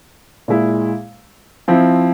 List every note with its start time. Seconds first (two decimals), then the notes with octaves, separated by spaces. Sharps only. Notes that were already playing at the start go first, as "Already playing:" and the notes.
0.48 A#2 G#3 E4
1.68 F3 C4 E4